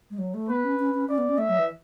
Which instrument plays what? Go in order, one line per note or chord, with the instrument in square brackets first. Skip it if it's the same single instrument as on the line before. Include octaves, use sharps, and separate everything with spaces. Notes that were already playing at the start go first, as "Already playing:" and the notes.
[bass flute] G#3
F#3
A3
[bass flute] B3 [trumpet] B4
[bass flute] C#4
C#4
C#4
[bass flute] C#4 [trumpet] D5
[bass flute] B3
C#4
[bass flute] A3 [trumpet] E5
[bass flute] F#3
E3